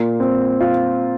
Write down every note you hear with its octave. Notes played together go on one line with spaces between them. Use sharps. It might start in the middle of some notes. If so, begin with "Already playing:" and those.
Already playing: A#2
C4
F4